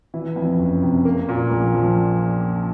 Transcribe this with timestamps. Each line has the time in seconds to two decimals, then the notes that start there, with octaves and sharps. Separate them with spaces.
0.14 E3
0.36 F2
0.59 F#1
0.82 C3
1.05 A#3
1.29 A#2
1.51 A#1
1.75 F3